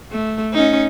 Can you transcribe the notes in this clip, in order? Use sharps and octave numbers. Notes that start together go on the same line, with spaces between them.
A3
C#4 D#4